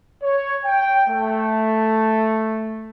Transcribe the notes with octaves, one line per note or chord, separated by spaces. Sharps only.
C#5
G5
A3